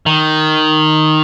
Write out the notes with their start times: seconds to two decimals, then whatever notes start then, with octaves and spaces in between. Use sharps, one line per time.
0.06 D#3